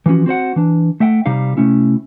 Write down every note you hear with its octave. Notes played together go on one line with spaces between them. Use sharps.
E3 F3 A#3 C#4 F#4
C4 F#4 C5 F#5
E3 D4
A3 E5 F#5 G5
C3 G3 D#4 F5
C3 A3 C#4 E4